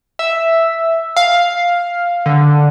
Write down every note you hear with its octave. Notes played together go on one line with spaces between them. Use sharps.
E5
F5
D3